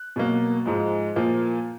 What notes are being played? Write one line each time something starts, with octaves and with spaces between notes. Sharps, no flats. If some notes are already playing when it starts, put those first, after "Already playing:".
Already playing: F#6
B2 F#3 A#3
G#2 F3 G#3
A#2 F3 A#3